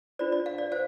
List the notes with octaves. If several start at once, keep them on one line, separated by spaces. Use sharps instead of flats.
D4 F4 C5 D5
D5
F5
D5
C5 F5